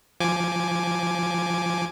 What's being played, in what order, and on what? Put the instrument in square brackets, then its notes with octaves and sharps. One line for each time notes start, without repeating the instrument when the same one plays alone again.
[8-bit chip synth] F3 G#5 D6